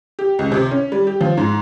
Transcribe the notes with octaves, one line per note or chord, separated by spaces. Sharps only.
G4
C#2
C3
C#4
G3
G4
F3
G#2